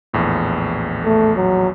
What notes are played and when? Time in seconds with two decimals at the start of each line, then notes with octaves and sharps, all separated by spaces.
0.13 A#1 E2 A2
1.05 A3
1.37 F#3